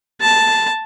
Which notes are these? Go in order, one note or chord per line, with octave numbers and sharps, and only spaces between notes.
A5